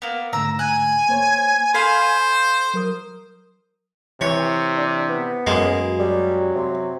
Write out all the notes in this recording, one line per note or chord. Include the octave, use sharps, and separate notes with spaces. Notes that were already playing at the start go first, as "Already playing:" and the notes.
A#3 B3
G#2 D3 A3 A#5 E6
G#5 F#6
A#3 C5 C#5
A4 C5 F5 B5 C6
F#3 A#4 D#6
C3 E3 C#5
D4
B3
F#2 G#3 A#3
F#3 G3
C3